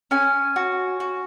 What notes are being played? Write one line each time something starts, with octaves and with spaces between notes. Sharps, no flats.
C#4 G#5
F#4
F#4